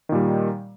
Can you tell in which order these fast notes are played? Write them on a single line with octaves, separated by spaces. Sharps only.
D#3 A#2 G3